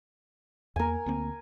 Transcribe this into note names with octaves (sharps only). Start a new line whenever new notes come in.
E2 A#3 A#4 G#5
D2 A#3 C4